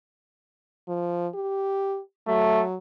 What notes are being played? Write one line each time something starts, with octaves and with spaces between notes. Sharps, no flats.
F3
G4
F#3 A3